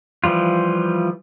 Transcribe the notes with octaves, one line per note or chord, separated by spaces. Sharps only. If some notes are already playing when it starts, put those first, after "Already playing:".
E3 F3 G3 F4